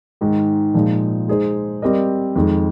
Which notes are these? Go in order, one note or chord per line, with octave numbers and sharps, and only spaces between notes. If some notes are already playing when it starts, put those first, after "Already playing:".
G#2 D#3 G#3
A#2 F3 G#3 D#4
G#3 D#4 G#4 C5
G3 C4 G4 A#4 D#5
F2 D#3 G#3